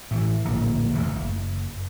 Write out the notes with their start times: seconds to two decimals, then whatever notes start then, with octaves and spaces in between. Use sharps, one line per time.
0.11 A2 D#3 E3
0.45 D1 A#1
0.95 F#1 D2 G#2 E3
1.15 F#1